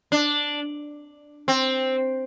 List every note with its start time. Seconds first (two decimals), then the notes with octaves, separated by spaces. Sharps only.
0.12 D4
1.48 C4